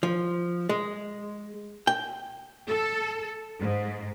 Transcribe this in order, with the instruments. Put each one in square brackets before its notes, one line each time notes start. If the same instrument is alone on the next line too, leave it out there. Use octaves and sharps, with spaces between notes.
[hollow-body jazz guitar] F3
G#3
G5
[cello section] A4
G#2